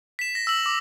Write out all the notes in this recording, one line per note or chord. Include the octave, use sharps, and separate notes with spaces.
B6 E7
A#6
E6 F#7
D6